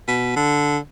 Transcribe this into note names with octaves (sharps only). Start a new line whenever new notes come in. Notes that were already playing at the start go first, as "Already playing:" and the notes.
B2
D3